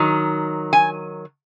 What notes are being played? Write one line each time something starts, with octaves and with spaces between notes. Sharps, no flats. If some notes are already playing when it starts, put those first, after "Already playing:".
Already playing: D#3 F#3
G#5